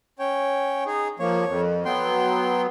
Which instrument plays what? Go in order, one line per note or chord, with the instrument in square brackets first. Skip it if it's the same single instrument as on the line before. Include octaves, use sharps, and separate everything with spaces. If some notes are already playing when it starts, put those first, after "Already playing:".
[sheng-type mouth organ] C#4 C#5 G5
D#4 G#4
[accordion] F3 A#3 [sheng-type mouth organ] C#5
[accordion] F2
[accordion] F#3 B3 [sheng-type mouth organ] G5 C6